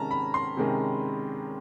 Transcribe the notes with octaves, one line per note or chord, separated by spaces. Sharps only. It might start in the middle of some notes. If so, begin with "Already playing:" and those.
Already playing: C3 D#3 G#3 C#4 A5 A#5
B5
C6
C3 D#3 G#3 C#4